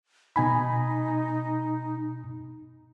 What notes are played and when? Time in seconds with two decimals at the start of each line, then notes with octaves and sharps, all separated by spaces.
0.36 B2 D#4 G#5 B5